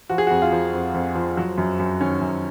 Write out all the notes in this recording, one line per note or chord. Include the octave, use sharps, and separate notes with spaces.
F3 F#4
G#4
F#4
F2
F4
F3
F2
F2
F3
F#3
F#2
F#2
D#3 C#4
F#2